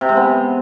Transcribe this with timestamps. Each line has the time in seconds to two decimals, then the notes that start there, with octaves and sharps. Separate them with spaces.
0.01 C3
0.09 G#3
0.17 B3